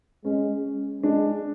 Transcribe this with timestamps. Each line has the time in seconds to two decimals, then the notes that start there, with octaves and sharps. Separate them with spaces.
0.25 G#3 C#4
1.02 G#3 D4